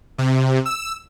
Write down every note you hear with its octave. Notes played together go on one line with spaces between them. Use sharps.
C3
E6